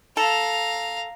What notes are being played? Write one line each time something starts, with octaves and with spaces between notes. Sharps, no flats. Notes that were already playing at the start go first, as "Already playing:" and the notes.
A4 F5 A#5